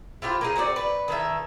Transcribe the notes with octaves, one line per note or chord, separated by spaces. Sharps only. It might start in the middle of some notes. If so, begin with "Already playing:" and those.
E4 F4 G4 C5
A#3 D#4 G#4
C4 F#4 C5 D5
B4
D#3 E3 A4 E5